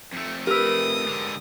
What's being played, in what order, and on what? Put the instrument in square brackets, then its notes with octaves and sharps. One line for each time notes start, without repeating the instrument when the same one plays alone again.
[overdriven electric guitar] F2 A3
[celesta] G4 E6 [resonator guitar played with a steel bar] A#4 B4 [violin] D#6
[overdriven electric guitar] G#2 D3